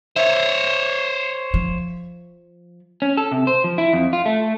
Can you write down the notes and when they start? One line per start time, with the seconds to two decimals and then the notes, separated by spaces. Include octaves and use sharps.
0.16 C5 C#5 E5
1.54 F3
3.02 C#4
3.17 A4
3.32 C3
3.47 C5
3.64 F3
3.78 E4
3.93 F2
4.13 F4
4.26 A3